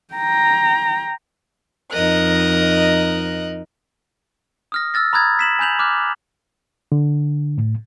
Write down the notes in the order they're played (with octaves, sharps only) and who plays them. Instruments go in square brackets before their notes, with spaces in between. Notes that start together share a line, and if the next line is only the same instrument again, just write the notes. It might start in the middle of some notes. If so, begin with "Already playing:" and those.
[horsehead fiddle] G5 A#5
[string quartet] F2 D#4 A#4 D#5 F#6
[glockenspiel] D#6 F6 A#6
E6 F6 A6 A#6
A#5 B5 D#6 F#6 G#6 A6
B6 E7 F#7
G#5 B5 G6 F7 F#7
D6 F6 F#6
[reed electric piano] D3
A2